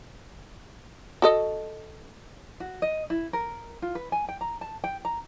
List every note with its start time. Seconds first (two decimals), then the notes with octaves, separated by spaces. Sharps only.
1.22 F#4 A4 D#5
2.60 F#4
2.82 D#5
3.10 E4
3.33 A#4
3.82 F4
3.95 B4
4.12 G#5
4.29 G5
4.41 A#5
4.61 A5
4.84 G5
5.05 A#5